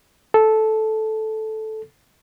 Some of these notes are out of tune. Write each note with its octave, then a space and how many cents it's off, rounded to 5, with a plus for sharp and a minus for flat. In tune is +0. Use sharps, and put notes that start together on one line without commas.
A4 -10